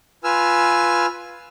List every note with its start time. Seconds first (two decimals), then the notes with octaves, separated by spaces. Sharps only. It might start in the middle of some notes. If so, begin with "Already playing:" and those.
0.24 F4 B4 G#5 E6 F6